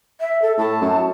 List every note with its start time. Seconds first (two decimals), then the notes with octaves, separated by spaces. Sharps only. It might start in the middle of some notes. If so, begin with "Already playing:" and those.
0.21 E5
0.42 A4
0.58 A2 A5
0.81 F#2